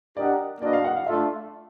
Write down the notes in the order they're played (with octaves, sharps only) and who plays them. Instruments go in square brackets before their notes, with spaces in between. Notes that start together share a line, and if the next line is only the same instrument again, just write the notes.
[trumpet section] D4 G4 A#4 D#5 F#5 [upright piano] D5
[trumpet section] A#3 D4 F#4 B4 D#5 [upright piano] D5
[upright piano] F5
F#5
F5
[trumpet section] A3 D4 F4 A4 [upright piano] E5